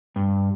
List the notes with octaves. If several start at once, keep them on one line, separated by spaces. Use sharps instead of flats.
G2